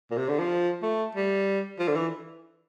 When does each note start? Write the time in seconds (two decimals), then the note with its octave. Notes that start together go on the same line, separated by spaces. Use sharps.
0.11 A#2
0.17 C3
0.28 D3
0.39 F3
0.82 A3
1.15 G3
1.79 F3
1.88 D3
1.96 E3